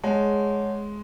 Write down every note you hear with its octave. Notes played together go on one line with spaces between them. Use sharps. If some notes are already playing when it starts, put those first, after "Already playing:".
G#3 G#4 C#5 F#5 A5